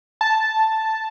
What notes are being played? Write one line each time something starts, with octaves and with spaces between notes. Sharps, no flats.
A5